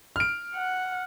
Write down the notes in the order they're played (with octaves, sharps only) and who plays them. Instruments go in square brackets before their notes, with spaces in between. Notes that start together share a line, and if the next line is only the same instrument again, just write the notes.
[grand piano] F6 D7
[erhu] F#5